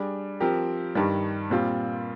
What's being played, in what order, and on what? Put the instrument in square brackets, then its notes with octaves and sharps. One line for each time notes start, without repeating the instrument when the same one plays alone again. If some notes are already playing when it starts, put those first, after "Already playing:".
Already playing: [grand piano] G3 D4 G#4
F3 C4 G4 A#4
G2 D#3 G3
A#2 G3 C4 F4